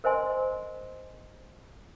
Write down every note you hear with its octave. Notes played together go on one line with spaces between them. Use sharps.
A#4 C5 D#5 G#5 C6